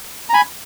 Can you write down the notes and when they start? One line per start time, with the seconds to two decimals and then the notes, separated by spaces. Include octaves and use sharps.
0.29 A#5
0.34 G#5 B5